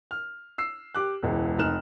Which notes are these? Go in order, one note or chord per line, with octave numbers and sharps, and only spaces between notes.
F6
E6 C7
G4 D6 F#6
E1 C#2 E3
F1 D#4 F6 F#6 E7